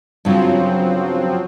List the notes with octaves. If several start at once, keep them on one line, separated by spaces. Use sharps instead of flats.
G2 C#3 F3 F#3 C4